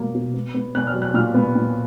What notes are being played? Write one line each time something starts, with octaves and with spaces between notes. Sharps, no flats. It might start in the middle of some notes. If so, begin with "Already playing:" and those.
Already playing: B2 A#3
B2
B3
B3
B3 F#6
F6
F#3
F#6
A#2 F6
B3
A#2